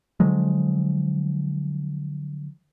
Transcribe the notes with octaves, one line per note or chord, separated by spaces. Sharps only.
D3 F3 F#3 G#3